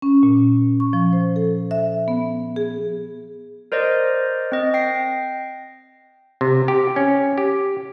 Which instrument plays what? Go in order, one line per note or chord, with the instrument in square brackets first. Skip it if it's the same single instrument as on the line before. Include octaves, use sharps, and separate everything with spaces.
[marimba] C#4
A#2
C#6
F3
C5
A4
E5
B3
G#4
[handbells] A#4 C5 D5 D#5
C4 D#5
G5 A#6 C7
[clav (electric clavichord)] C3
G4
C#4
G4